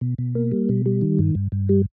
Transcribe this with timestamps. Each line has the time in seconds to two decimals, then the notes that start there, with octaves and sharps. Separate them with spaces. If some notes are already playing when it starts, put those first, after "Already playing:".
0.01 B2
0.18 B2
0.35 A#3
0.52 G3
0.69 B2
0.86 G3
1.01 D#3
1.19 G2
1.35 G2
1.52 G2
1.69 G3